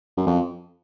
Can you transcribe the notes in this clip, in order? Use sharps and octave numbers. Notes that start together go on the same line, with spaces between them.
F#2
F2